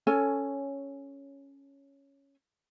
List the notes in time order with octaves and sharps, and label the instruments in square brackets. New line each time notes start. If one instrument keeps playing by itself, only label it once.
[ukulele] C#4 A4 C#5 G#5